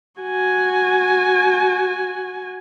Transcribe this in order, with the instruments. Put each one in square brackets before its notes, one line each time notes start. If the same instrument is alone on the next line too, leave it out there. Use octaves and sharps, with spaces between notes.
[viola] F#4 G#5